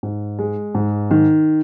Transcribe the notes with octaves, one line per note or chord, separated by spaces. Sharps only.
G#2
G#3
G#2
D#3